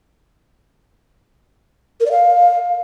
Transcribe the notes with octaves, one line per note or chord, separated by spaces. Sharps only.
A#4
D5
F5